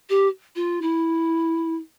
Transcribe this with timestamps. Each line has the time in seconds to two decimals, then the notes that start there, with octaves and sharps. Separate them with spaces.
0.10 G4
0.56 F4
0.82 E4